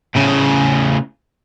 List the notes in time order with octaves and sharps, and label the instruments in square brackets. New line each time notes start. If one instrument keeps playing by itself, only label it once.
[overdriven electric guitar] A2 C#3